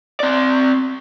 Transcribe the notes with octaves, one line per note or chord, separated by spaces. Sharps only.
C4 D5